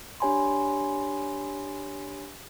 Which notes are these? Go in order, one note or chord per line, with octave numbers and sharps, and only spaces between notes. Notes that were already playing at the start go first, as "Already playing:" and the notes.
D4 G4 C#5 G#5 B5 C6